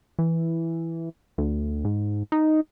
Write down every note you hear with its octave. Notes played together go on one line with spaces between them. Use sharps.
E3
D2
G#2
D#4